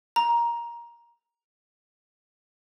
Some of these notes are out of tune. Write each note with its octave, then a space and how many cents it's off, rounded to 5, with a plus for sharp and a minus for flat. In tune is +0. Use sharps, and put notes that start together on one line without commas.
A#5 +15